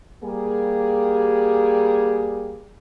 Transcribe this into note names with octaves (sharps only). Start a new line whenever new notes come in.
G3 A#3 G#4